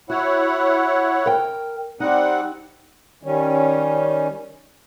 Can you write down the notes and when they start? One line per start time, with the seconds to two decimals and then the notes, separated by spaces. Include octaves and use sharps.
0.10 E4 F#4 C#5 F#5
1.26 A#4 G5
2.00 G3 C4 D#4 F#5
3.23 D#3 G3 C#4